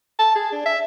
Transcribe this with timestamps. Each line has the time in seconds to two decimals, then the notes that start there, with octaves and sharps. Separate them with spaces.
0.19 A5
0.35 G#4
0.52 D4
0.66 E5